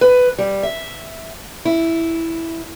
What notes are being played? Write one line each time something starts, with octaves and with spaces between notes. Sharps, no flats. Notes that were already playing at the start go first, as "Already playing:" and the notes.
B4
G3
E5
E4